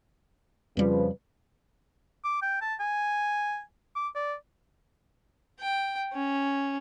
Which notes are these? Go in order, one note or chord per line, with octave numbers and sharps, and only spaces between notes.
F2 C#3 F3 G3 B4
D6
G5
A5
G#5
D6
D5
G5
C#4